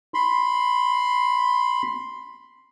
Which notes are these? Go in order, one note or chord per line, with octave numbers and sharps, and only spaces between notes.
B5 C6